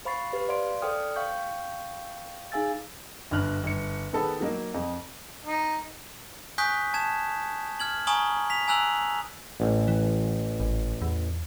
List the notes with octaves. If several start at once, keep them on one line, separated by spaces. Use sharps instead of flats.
C5 F5 B5 C#6 A6 C7
G4 B4
C5 D5 F5 C6 D7
A4 C5 D5 G5 D#6 F6
F5 G5 C#6 G6
D#4 G#4 F5 G#5 E6 A6
G1 G2 F6 F#6
G1 C#7
D#3 B3 G#4 A4 B4
F#3 A#3 D#4
F2
D#4
G#5 C#6 D#6 F#6 G6 B6
A5 G#6 E7
F6 G#6 F#7
G#5 A#5 C#6 D#6 F#7
B6 F7
G#5 A#5 E6 F#6 F7 F#7
A1
E3
G#1
E2